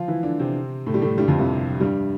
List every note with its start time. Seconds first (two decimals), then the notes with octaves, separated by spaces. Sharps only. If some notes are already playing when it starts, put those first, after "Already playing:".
Already playing: F3 F4
0.08 E3 E4
0.23 D3 D4
0.39 C3 C4
0.86 A2 A3
0.94 G3
1.02 A2 A3
1.17 G2 G3
1.28 F2 F3
1.39 C2 C3
1.80 G2 G3